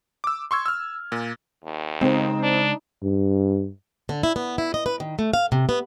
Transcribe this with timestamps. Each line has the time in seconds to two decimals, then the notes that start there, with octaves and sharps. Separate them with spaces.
0.24 D6 E6
0.51 C6 C#6 E6 G#6
0.66 E6 F6
1.12 A#2
1.64 D#2
2.01 C#3 G#3 C4 D#4
2.43 D4
3.03 G2
4.09 D3
4.23 E4
4.36 B3
4.58 E4
4.74 D#5
4.86 B4
5.00 D#3
5.19 A3
5.33 F5
5.52 C3
5.69 B3